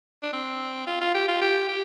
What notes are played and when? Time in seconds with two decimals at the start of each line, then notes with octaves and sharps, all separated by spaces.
0.23 D4
0.33 C4
0.87 F4
1.01 F4
1.15 G4
1.28 F4
1.41 G4
1.69 G4